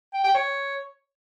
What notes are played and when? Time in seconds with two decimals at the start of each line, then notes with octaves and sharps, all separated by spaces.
0.13 G5
0.24 G5
0.34 C#5